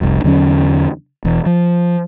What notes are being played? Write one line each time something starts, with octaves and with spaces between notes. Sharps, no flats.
F1 C2 F2
E2 D3 F#3 C#4
E1 E2
F3